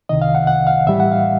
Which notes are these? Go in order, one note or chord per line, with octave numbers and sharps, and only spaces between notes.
C2 C3 D#3 D#5
F5
F#5
F#5
F5
A2 E3 G3 E5
F#5
F5